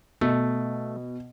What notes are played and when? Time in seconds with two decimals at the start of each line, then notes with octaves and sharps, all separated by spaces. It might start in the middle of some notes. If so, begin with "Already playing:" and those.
0.21 B2 A3